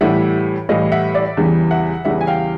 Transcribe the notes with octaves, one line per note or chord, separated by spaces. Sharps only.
A2 E3 G3 E5 F#5
A2 E3 G3 D#5 F5
E5 F#5
D5 E5
E2 C#3 E3 G3
E5 F#5
E2 C#3 E3 G3 E5 F#5
G#5
F5 G5